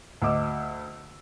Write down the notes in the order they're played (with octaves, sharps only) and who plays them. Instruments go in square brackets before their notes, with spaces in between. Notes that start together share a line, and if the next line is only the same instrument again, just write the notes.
[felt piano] D2 D#5 D6 E6